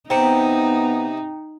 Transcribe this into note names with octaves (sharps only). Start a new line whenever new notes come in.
C3 B3 D#4 G5 A#5 C#7